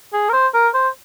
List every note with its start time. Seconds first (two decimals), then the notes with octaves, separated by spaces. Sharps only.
0.13 G#4
0.29 A#4
0.33 C5
0.54 A#4
0.74 C5